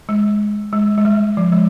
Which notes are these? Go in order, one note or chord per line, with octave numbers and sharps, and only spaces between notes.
G#3
G#3
G#3
G3
F3
G#3